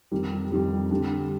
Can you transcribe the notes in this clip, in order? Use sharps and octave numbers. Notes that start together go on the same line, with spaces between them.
F2 D#3 G3
F2 D#3 G3
D3 G3 D4